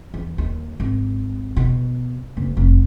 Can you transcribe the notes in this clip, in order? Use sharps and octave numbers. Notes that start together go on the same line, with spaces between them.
E2
D#2
G#1
B2
F#1
F1